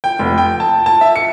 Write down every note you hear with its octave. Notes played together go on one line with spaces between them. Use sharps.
G5
F1
G5
A5
A5
E5
C#7